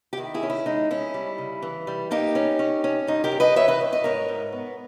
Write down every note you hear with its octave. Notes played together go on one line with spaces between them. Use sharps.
G4
D#3 E4
E4 G#4
C#4
E4
G#3 D#4
C#4 E4
G3
C#3
E3
G3
A#3 D#4 G4
C#4
C#4
C#4
G2 D#4
G4 A#4
G2
B4 D#5
E3 C#5 E5
B4 D#5
G2
B4 D#5
G#2 A#4 C#5
G#2
B3